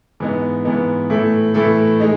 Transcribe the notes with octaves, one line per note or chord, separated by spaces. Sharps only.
G#2 E3 B3 D#4
G#2 E3 B3 D#4
A2 E3 A3 E4 A4
A2 E3 A3 E4 A4
G#3 D#4